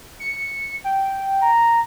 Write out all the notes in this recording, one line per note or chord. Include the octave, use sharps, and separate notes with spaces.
C#7
G5
A#5